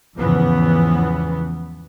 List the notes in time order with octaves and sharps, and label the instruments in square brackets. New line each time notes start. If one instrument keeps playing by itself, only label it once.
[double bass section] E2 G#2 C#3 E3 F3 B3